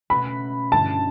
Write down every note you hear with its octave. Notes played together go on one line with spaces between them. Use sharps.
B2 A3 C#4 F#4 B4 B5
G2 D3 A3 C#4 E4 A5